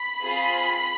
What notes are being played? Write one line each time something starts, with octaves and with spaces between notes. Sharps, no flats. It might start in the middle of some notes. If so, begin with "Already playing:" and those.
Already playing: B5
C4 F4 G#4